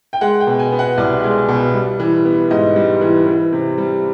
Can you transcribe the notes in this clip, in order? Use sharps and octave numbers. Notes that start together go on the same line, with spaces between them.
G5
G#3 F#5
G5
B2
G#5
B3
F#5
C2 D5
G#3
B2
G3
E3
B3
G#2 D#5
G3
E3
E3
C3
G3